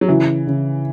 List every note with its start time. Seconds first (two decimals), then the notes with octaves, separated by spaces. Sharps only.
0.01 F#3
0.08 C#3 E3
0.47 C#3